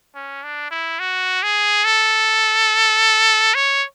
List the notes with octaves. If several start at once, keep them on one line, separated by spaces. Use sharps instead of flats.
C#4
D4
E4
F#4
G#4
A4
C#5